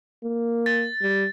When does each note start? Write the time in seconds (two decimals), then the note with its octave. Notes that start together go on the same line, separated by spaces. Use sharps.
0.23 A#3
0.66 A6
1.02 G3